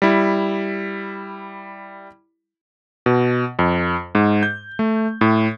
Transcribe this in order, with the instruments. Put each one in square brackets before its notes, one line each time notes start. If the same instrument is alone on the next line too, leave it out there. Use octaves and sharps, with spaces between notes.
[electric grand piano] G3 E4
B2
F2
G#2
G6
A3
A2